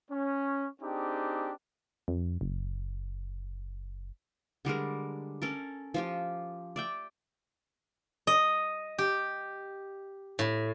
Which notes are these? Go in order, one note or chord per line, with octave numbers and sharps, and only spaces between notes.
C#4
C4 D4 D#4 G4 G#4
F2
F#1
D3 G3 G#3 A#4
C#4 A4 A#4
F3 F4 G4
D5 E5 G5
D#5
G4
A2